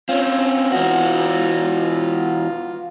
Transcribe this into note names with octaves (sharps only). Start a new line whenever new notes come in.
C4 C#4 F4
E3 B3 F#4